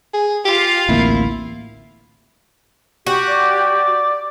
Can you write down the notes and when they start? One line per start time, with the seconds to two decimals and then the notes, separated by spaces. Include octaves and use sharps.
0.14 G#4
0.45 F4 G4 F5
0.89 A1 D2 A#3 C4 E4
3.07 F#4 G4
3.28 D5